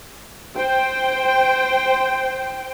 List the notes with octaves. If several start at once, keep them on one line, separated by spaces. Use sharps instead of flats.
C5 G5